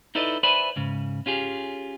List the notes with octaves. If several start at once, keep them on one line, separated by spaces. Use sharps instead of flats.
D#4 E4 A4 B4 D5 D#5
B4 C5 D5 E5 G#5 B5
G#2 C#3
C#4 F4 G4 G#4